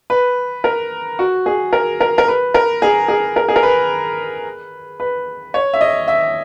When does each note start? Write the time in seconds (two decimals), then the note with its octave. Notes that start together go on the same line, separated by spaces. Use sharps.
0.10 B4
0.64 A#4
1.19 F#4
1.46 G#4
1.73 A#4
2.01 A#4
2.18 A#4
2.28 B4
2.54 A#4
2.82 G#4
3.08 G#4
3.36 A#4
3.49 G#4
3.56 A#4
3.63 B4
5.00 B4
5.54 C#5
5.74 E5
5.81 D#5
6.08 E5